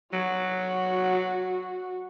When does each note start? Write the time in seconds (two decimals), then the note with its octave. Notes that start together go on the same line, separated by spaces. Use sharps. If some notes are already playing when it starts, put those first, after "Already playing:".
0.13 F#3 F#4